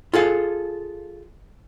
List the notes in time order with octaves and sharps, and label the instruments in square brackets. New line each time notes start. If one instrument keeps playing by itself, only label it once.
[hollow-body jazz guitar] F4 G#4 A4 F5